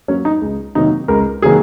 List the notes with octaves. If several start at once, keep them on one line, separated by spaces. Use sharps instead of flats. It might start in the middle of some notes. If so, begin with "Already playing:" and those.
F#3 A#3 C#4
D#4
C#2
C3 D#3 F#3 A#3 D#4
C#2 A#4
C3 D#3 F#3 A#3 G#4